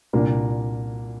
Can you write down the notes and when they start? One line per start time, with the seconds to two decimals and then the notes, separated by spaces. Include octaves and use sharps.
0.13 C2 A#2 A#3 D4